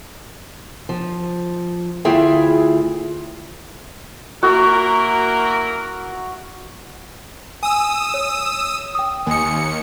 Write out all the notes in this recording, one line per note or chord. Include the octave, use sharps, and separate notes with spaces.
F3
D2 E4 F4 G#4 E5 G5
A#3 E4 F#4 A#4
G#5 D#6 E6
C#5
G5 D#6
D#2 G#5 D#6 C#7